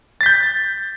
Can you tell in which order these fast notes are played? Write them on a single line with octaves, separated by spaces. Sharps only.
A6 B6 G6